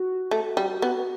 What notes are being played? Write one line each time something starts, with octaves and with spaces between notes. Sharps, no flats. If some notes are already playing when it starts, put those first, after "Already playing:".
Already playing: F#4
A3
G3
B3